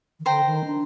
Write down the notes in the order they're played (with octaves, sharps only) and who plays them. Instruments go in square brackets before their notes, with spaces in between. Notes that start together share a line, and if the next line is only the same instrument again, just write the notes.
[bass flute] D#3
[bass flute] D3 [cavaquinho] C5 G5 A#5
[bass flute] D#3
D4